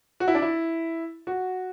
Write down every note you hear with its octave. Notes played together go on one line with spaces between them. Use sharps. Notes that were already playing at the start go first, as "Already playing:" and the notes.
F#4
E4
D4
E4
F#4